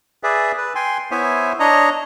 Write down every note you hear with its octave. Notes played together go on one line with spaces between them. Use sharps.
G#4 B4 D5 E5
B4
G5 G#5 C6
B3 E4 C5 C#5 E5 G#5
D4 C#5 D#5 A#5